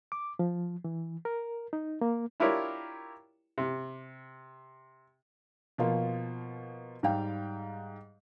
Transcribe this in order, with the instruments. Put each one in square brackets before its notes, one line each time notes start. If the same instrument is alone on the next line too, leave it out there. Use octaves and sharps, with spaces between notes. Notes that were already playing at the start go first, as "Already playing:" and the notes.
[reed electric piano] D6
F3
E3
A#4
D#4
A#3
[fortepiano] D4 E4 F4 G4 A#4 C#5
C3
[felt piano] B2 F3 A#3 F4
G#2 G3 F5 G5